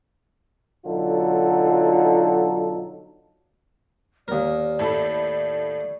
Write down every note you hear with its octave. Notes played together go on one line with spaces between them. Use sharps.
B1 D3 F#3 D#4 F4 A4
D#2 A#4 D5
A2 A4 B5